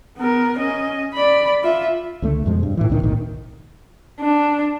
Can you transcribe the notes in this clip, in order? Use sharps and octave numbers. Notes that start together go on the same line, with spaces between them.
B3 A#4
C#4 D#5
D5 B5
F4 E5
C#2 D3 A3
F2 B2 F3 G#3
G2
A2 E3
C2 A2 D3 D#3
G#1 D2 A#2 D#3
D4